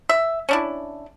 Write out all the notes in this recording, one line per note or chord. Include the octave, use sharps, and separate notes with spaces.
E5
C#4 D4 E4